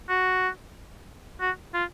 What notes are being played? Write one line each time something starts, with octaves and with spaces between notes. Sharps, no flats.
F#4
F#4
F4